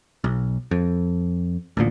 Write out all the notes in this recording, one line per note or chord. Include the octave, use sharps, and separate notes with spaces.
B1
F2
A1 D2 A#2